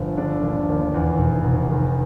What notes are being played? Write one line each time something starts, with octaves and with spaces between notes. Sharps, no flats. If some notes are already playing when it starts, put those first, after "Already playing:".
Already playing: G1 F3
D3 D4
D#2
D4
D#2
E2
F1
F1
D#3